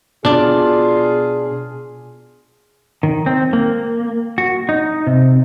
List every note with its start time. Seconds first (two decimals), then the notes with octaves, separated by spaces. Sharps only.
0.25 B2 D4 F4 G#4 D5
3.03 D#3
3.26 C4
3.53 A#3
4.38 F#4
4.69 D#4
5.07 C3